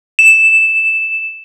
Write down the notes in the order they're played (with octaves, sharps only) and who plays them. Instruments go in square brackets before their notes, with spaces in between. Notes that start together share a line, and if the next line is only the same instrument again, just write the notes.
[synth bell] E7